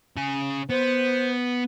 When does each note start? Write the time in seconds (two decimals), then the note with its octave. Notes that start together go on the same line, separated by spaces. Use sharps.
0.17 C#3 G#5
0.70 B3 C5